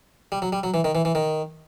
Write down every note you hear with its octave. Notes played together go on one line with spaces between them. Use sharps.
G3
F#3
G3
F#3
E3
D#3
E3
E3
D#3